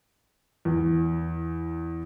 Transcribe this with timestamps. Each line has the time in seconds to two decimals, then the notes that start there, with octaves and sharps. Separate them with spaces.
0.65 E2